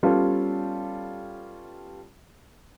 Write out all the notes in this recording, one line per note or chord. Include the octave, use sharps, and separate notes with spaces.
G3 B3 C#4 F4 A4